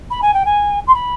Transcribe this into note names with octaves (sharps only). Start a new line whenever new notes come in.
B5
G#5
G5
G#5
C6
B5